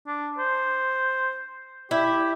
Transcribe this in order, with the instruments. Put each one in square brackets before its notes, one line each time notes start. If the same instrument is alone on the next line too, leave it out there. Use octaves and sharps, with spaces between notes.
[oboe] D4
C5
[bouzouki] E4 [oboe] G4